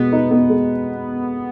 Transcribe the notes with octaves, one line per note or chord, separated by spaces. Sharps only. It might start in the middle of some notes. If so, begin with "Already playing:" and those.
Already playing: B2 G#3 B3
D#4
B3
G#3